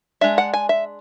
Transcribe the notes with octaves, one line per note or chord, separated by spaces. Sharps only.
G#3 D4 E5
F#5
G#5
E5